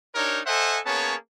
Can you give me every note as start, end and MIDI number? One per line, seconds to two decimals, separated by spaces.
0.15 0.40 62
0.15 0.40 63
0.15 0.40 67
0.15 0.40 70
0.15 0.40 73
0.46 0.79 69
0.46 0.79 72
0.46 0.79 75
0.46 0.79 76
0.46 0.79 78
0.46 0.79 80
0.86 1.15 58
0.86 1.15 59
0.86 1.15 61
0.86 1.15 68
0.86 1.15 73
0.86 1.15 81